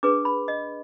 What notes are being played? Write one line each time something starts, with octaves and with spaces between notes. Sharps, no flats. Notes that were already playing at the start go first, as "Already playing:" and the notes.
D4 G#4 B4 D6
B5
D#5